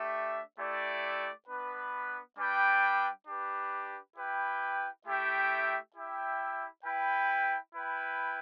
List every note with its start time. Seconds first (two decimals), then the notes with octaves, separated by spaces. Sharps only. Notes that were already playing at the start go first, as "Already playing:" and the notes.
Already playing: A3 D4 G4 E5
0.59 A3 E4 G4 D5
1.48 B3 D4 B4
2.37 G3 D4 B4 G5
3.27 D4 G4 B4
4.16 E4 G4 B4 G5
5.06 A3 E4 G4 E5 G5
5.95 E4 G4 E5 G5
6.85 E4 B4 G5
7.74 E4 B4 G5